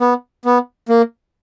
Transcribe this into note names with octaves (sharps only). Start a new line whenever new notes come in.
B3
B3
A#3